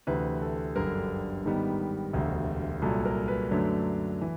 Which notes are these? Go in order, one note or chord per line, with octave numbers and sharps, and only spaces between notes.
D2 C3 E3 B4
A4
G1 F#2 D3 G3 A#4
G#2 D#3 G3 B3
E1 D2 C3
C2 A#2 F#3 A4
A#4
B4
F#2 D3 F#3 A3 D4
E3